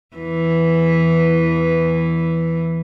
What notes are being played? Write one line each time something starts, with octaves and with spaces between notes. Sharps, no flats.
E2 E3